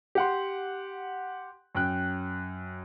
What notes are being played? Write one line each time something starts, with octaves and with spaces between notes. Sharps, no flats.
G4 F#5 C6
F#2 G5 F#6